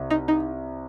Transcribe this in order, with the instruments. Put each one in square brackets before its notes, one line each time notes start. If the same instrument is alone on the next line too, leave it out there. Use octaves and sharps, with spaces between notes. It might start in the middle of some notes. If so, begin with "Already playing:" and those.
Already playing: [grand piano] C2
[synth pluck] D#4
D#4